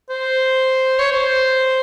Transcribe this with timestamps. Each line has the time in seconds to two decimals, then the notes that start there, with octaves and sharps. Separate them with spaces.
0.10 C5
0.99 C#5
1.12 C5